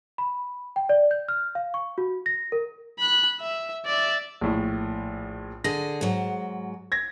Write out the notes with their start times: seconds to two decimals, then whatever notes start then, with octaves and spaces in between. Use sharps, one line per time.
0.18 B5
0.76 G5
0.89 D5
1.11 G6
1.29 F6
1.55 F5
1.74 C#6
1.98 F#4
2.26 A#6
2.52 A#4
2.99 B5 F#6
3.41 E5
3.85 D5 E5
4.41 A#1 A2
5.64 D3 G#4 A#6
6.01 G#2 F#3
6.92 G#6 A#6